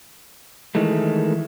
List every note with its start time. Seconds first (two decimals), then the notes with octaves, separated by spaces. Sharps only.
0.75 D#3 E3 G#3 A3